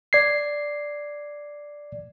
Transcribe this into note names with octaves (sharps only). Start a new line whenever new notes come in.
D5 G#6 C7